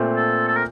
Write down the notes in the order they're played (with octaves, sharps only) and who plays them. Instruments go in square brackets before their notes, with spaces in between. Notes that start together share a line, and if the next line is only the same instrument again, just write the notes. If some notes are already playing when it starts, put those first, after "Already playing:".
Already playing: [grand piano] A#2 A3 C4 F4
[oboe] A4
A4
A#4